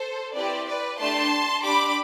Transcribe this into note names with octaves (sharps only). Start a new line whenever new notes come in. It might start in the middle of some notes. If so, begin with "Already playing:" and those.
Already playing: A4 C5
C4 E4 G4 B4 D5
B4 D5
A3 D4 G4 A5 C6
D4 G4 B5 D6